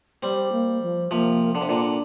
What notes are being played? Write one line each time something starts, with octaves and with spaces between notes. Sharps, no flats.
G3 C4 G4
A#3
F3
C3 F3 A#3
D3 D4
C3
A#2 D3